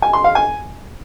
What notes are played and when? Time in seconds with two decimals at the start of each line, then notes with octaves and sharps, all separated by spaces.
0.02 G#5
0.13 C6
0.24 F5
0.35 G#5